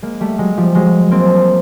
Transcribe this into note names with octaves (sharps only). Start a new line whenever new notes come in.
G#3 A#3
G3 A3
F#3 G#3
F3 G3
F#3 G#3
A#3 C4